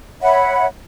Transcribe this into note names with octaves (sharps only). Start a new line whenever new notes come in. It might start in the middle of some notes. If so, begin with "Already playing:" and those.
C#5 E5 F#5 B5